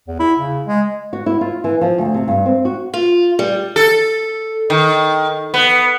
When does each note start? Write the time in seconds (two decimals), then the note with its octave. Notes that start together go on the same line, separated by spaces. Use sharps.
0.08 E2
0.20 E4
0.39 C#3
0.66 G#3
1.13 F#4
1.26 E4
1.41 F4
1.64 E3
1.81 F3
1.98 D2
2.14 C3
2.28 G2
2.46 C4
2.65 F#4
2.94 F4
3.39 G3
3.76 A4
4.70 D#3
5.54 B3